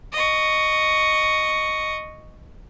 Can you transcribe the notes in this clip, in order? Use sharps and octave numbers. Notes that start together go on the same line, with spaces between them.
D#5 C#6